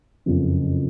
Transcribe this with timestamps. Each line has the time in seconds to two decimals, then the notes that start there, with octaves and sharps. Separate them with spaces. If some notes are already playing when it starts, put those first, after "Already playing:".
0.26 F#1 F2 C#3